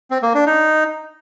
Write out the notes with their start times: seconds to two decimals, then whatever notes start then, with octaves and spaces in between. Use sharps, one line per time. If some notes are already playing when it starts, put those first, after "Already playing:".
0.11 C4
0.23 A#3
0.35 D4
0.47 D#4